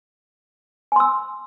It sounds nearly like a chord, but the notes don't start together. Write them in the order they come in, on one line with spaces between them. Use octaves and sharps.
G#5 C6 E6